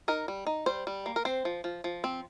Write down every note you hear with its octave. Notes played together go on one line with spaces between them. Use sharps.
D#4 A#4
G3
D#4
G3 C5
G3
A#3
A#4
C4 C5
F3
F3
F3
C4